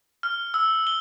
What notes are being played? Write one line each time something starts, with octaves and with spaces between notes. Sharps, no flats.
F6
E6
G7